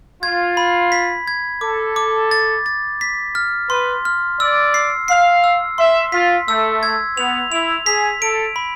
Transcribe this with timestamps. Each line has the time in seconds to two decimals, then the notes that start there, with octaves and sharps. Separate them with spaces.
0.23 F4 G#6
0.57 B5
0.92 B6
1.28 G#6
1.61 A4 D6
1.96 D6
2.31 A6
2.66 A6
3.01 B6
3.35 F6
3.70 B4 C6
4.05 F6
4.40 D5 E6
4.74 C7
5.08 F5 C7
5.44 E6
5.78 E5 C6
6.12 F4 B6
6.48 A3 E6
6.83 G#6
7.17 B3 F7
7.51 E4 F7
7.86 G#4 B6
8.21 A4 D7
8.56 B5